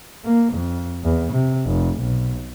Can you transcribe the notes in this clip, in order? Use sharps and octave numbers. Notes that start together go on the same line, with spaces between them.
A#3
F2
E2
C3
F1
B1